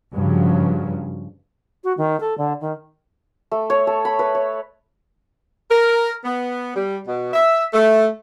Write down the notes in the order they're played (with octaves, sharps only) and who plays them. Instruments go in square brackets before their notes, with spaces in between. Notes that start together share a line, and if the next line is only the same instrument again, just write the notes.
[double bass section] G2 C#3 F3 F#3
[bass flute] F#4
D#3
A4
D3
D#3
[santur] A3
C#5
A4
B5
B4
C#5
[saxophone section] A#4
B3
G3
B2
E5
A3